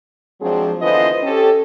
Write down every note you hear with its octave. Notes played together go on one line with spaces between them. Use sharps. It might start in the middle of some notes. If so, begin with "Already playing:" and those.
F3 F#3 G#3 C4 D4 G#4
D3 E3 B3 F4 C5 D#5
C#4 G4 A4